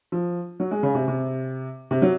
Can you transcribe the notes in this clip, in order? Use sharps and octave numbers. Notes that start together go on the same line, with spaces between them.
F3
F#3
G#3
C#3
C3
C3
C3
F#3